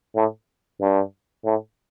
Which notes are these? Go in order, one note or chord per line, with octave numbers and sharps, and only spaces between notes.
A2
G2
A2